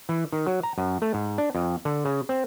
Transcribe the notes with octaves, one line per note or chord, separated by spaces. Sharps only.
E3
D#3
F#3
A#5
F#2
A3
G#2
D4
F2
D3
C#3
C4